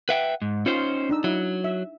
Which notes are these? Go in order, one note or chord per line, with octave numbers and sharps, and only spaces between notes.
B4 E5 F#5 G5
G#2
C#4 D#4 F4 C5 F5
D4 D#4 E6
F#3 E4
E5